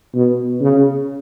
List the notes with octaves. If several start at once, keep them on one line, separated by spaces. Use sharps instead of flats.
B2
C#3